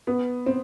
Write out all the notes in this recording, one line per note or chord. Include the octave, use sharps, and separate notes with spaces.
B3
C4